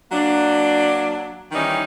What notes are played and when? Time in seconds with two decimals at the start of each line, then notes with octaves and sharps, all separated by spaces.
0.11 F#3 A#3 D4
1.52 D#3 E3 G3 C#4 D#4